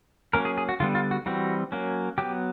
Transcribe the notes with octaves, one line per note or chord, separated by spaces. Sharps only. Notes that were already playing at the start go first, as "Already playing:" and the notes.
F#3 A#3 C#4 A#4
G#4
G#4
F#4
D3 G3 B3 F4
F4
F#4
E3 G3 C4 F#4
F#3 A#3 C#4
F#3 B3 G4